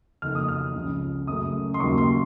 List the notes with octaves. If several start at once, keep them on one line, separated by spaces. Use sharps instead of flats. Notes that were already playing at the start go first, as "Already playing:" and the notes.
F#1 F2 D#3 F6
D#6
F6
C#2 C#3 F3
F#2 C#3 A3 D#6
C6
D#2 C#3 F#3 A#3 C#6
C6